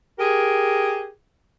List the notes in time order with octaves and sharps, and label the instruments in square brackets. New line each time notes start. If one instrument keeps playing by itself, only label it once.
[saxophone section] G4 G#4 A#4